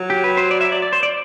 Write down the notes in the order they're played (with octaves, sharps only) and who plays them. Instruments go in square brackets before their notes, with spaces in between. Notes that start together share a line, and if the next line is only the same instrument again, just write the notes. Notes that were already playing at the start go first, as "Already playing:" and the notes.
Already playing: [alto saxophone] F#3
[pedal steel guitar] G4
B4
C5
D5
E5
D5
D5
C5
D5